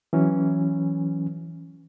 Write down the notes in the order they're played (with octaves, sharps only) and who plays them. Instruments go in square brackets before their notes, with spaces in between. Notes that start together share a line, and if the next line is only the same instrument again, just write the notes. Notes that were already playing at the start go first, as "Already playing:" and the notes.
[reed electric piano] E3 F#3 C#4